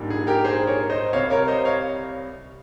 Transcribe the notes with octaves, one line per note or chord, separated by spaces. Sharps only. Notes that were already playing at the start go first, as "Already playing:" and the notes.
Already playing: A#1 G#2 G3 A#3
G#4
G4 A#4
G#4 C5
A#4 C#5
C5 D#5
C2 C3 G3 C#5 F5
A#4 C#5
C5 D#5
C#5 F5